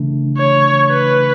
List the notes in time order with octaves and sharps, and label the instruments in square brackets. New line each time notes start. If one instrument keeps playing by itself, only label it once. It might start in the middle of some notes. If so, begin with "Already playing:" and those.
Already playing: [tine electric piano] C#3 E3 A3 D4
[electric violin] C#5
B4